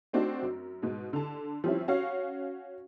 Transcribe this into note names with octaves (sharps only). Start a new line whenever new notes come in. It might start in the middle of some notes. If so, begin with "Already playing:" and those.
A3 C4 D4 D#4 F#4
F#2
G#2 B2
D3 A5
F3 G3 C4 C#4 E4
C#4 F#4 C#5 F5